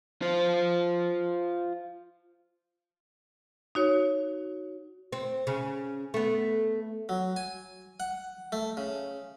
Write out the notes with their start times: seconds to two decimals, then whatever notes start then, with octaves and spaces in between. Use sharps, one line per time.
0.22 F4 C5
3.75 D#4 F#4 C#5
5.12 C4
5.47 C#3
6.14 A3 B3
7.09 F#3
7.36 G#5
8.00 F#5
8.52 A3
8.77 C#3